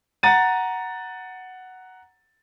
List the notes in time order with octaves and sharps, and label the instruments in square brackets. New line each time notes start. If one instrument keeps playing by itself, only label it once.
[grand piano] F#5 A#5 A6 D#7